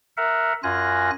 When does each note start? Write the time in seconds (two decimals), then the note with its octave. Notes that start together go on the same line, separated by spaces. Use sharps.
0.17 A#4 E5 F#5
0.63 F#2 F4 G#5 F#6 A#6